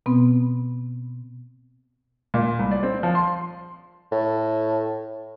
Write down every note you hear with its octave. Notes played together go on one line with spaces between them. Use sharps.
B2 B3 C4
A#2
C2
D5
C4
F3
C6
A2